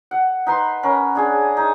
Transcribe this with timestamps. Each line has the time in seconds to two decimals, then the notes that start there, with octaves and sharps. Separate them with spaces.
0.11 F#5
0.46 D#4 B4 C6
0.83 C#4 A#4 B5
1.15 D4 G#4 G#5
1.57 D#4